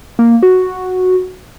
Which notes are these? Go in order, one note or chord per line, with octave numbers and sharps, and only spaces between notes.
A#3
F#4